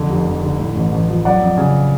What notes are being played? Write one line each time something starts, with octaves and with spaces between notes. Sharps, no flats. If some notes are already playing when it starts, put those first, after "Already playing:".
Already playing: F2 D3
F1
F2
D3
A2
A1
A1
F3
F#3 D5 F#5
F2
C#3